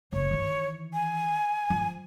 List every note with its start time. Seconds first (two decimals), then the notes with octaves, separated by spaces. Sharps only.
0.13 F#1 C#5
0.31 D#3 E3
0.94 G#5
1.70 F3